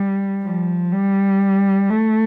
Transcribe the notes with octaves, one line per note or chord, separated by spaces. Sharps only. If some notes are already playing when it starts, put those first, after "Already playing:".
Already playing: G3
F3
G3
A3